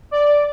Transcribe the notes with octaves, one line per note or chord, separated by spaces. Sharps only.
D5